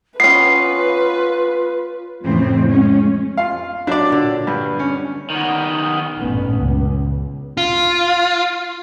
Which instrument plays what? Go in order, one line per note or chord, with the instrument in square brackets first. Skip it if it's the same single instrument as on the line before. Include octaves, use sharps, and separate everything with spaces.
[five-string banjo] B3 C#4 [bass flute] F4 [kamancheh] B4 [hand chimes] C7
[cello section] F2 A2 C#3 E3 C4
G#3 C#4
[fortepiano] F4 F5
[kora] F#3 E5 G5 [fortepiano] D4 D5
[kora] A#2 D3
[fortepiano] G2 [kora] B4
[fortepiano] C#4
[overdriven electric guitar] D#3 B3
[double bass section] A1 G2 A#2 B3 C#4
C#2
[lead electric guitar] F4